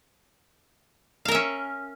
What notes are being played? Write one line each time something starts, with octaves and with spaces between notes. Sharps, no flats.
C#4 A#4 E5 F5